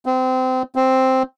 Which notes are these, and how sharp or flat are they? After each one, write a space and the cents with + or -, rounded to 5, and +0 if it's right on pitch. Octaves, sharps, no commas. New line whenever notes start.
C4 -25
C4 +0